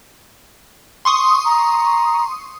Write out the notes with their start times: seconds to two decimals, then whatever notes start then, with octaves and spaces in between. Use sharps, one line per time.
1.05 C6 C#6 D#6
1.45 A#5